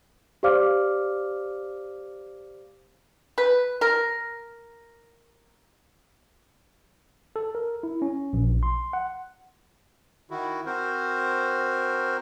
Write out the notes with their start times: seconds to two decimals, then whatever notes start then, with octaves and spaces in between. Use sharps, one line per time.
0.43 G4 C5 D5 F5 D6 F6
3.38 B4
3.81 A#4
7.36 A4
7.55 A#4
7.83 E4
8.02 C#4
8.33 A#1
8.63 C6
8.93 F#5
10.30 D#3 E4 F#4
10.66 C4 F#4 A#4 C5